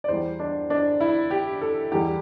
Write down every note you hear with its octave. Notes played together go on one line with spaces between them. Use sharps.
D5
E2 E3 G3 C5
D4
D4
E4
G4
A4
E2 E3 G3 G4